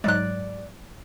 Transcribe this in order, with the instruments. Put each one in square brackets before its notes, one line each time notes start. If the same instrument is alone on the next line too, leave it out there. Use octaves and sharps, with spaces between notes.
[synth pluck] G#2 F#3 G#3 [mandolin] D5 F#6